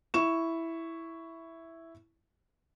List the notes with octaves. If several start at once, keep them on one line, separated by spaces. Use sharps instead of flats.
E4 C#6 E7